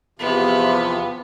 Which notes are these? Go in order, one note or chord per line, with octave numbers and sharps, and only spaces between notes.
E2 C3 F3 B3